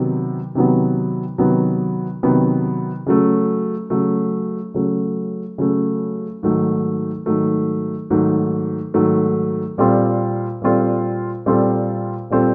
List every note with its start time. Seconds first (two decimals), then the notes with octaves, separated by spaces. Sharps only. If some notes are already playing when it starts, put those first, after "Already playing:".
Already playing: C3 D#3 F#3 B3
0.55 C3 D#3 F#3 B3
1.38 C3 D#3 F#3 B3
2.23 C3 D#3 F#3 B3
3.06 C#3 F#3 A3
3.90 C#3 F#3 A3
4.74 C#3 F#3 A3
5.58 C#3 F#3 A3
6.43 G#2 D#3 F#3 A3
7.26 G#2 D#3 F#3 A3
8.10 G#2 D#3 F#3 A3
8.94 G#2 D#3 F#3 A3
9.78 A#2 G3 C4 F4 A4
10.62 A#2 G3 C4 F4 A4
11.46 A#2 G3 C4 F4 A4
12.30 A#2 G3 C4 F4 A4